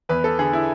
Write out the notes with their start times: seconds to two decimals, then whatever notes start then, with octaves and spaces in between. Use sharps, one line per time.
0.09 E2 B4
0.24 A4
0.39 D3 G#4
0.53 E4